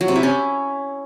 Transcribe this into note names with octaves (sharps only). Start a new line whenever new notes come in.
F#3
C3
E4
C#4